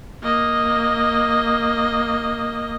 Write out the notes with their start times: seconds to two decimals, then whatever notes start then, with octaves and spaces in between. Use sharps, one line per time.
0.23 A#3 D#5